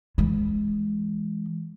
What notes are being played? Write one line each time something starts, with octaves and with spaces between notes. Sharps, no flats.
E3 G#3